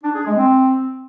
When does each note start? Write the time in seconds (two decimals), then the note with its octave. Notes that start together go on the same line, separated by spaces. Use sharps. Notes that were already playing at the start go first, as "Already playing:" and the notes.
0.03 D4
0.14 G#4
0.25 G#3
0.37 C4